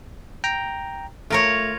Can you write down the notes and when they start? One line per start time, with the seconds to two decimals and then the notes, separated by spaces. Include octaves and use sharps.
0.44 G5 A#5
1.30 A3 F4 A#4 C#5